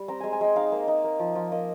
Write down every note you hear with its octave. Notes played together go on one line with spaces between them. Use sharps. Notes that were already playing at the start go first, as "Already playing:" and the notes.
Already playing: G3
C4 A#5
G#3 G#5
G#5
G#3 G5
D#4 F5
A#3
D#4
A#3
F3
F3
A#3 D#5